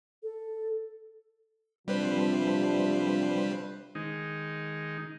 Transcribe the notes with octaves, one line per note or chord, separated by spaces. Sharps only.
A4
C3 F3 G3 D4 B4 C5
D#3 G#3 D#4